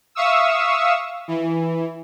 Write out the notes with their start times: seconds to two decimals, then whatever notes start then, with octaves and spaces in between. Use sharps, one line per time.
0.15 E5 F5 C#6 D#6 E6
1.28 E3